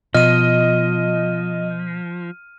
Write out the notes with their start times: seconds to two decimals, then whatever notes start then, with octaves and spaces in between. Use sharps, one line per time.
0.14 B2 F3 D#5 F6 D#7